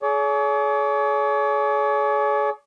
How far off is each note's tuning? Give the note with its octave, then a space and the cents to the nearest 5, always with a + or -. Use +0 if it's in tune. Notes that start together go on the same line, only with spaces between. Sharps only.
G#4 +35 C#5 +40 D6 +20